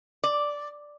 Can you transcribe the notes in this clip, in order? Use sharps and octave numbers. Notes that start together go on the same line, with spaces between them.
D5